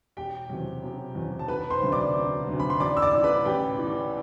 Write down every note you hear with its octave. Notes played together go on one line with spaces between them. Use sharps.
E1 G4 G5
E2 C3 F#3
E1
E2 C3 F#3
A5
E1 B4 B5
C5 C6
D2 C3 F#3
D5 D6
E1
D2 C3 F#3
B5
C6
A1 D5 D6
E6
D5 D6
A2 E3
B4 B5
A1 G4 G5
A2 E3